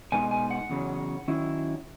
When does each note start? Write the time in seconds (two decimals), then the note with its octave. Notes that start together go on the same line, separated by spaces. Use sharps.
0.12 B2 G#3 B3 D#4 G#5
0.31 G#5
0.51 F#5
0.70 E2 C#3 F#3
1.28 D#3 F#3 C#4 E4